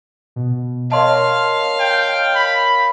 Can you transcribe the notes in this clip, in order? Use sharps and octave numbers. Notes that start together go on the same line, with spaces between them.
B2
A#4 C#5 D#5 F5 A5 C6
G5
B5